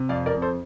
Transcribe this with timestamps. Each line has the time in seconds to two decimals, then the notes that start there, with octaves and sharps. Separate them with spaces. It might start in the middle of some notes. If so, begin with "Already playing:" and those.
Already playing: C3
0.09 F2 D5 F5
0.26 A#4 D5
0.34 F2
0.42 A4 C5